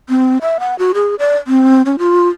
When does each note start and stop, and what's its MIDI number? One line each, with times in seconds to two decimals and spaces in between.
0.09 0.38 60
0.42 0.58 76
0.60 0.77 78
0.79 0.92 66
0.94 1.15 68
1.19 1.37 74
1.47 1.82 60
1.86 1.96 61
1.99 2.28 65